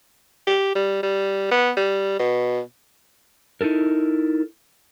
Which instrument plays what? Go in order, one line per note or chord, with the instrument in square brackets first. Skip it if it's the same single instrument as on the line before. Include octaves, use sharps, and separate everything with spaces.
[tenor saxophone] G4
G3
G3
B3
G3
B2
[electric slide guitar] D#4 E4 A4 A#4